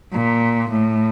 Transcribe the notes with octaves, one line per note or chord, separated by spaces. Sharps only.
A#2
A2